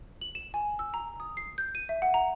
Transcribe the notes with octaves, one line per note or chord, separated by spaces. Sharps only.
F#7
E7
G#5
E6
A#5
D#6
C7
G6
D#7
E5
F#5
A#5